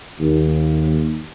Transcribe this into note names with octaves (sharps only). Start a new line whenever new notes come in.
D#2